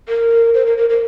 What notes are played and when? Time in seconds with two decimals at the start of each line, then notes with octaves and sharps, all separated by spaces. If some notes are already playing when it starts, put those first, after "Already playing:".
0.08 A#4
0.54 C5
0.66 A#4
0.78 A#4
0.89 A#4